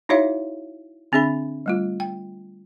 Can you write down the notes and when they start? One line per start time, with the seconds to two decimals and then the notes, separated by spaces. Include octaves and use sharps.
0.09 D#4 E4 F#4 C#5 E5 F5
1.12 D3 C4 D4 G#4 E5 B5
1.66 G3 A3 F4
2.00 G5